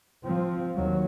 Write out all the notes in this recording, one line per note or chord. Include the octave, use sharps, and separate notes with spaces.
F3 C4
D#2 F#3